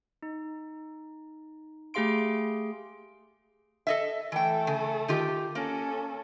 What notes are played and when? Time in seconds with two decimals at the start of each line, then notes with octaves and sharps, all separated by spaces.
0.23 D#4
1.94 A3 G4 G#4 F5 C6 D7
3.87 A4 D#5 E5
4.32 E3 A3 A4 G5
4.67 C#3
5.08 D#3 F4 G4
5.55 A#3 C#4 A4